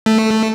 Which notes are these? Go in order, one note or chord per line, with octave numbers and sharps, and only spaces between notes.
A3